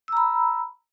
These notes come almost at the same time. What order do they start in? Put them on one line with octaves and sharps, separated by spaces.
E6 A#5 B5